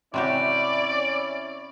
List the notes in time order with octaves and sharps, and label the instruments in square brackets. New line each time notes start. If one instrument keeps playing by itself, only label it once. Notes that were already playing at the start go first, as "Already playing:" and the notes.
[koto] C3 F#4 G4 [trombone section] C#4 E4 [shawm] D5